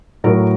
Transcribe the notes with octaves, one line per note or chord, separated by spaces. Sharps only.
A2 F#3 A#4